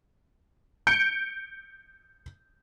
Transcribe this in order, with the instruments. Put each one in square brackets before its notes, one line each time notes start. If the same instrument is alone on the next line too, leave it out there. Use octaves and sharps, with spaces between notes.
[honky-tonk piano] G6 C#7 D7